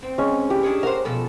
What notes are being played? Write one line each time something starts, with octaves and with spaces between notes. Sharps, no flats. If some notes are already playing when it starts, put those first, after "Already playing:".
C4
G#3 C#4
E3 G4
D4 G#4 C#5
A#4 C5 F#5
B2 F3 A4